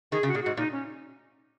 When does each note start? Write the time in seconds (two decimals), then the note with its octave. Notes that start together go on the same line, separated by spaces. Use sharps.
0.12 D#3 G#4
0.23 C#3
0.28 F#4
0.35 A#2 G#4
0.42 G#2 F#4
0.57 A#2 D#4
0.72 C#4